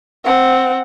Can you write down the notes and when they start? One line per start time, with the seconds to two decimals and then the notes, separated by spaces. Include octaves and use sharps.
0.25 C4 F#5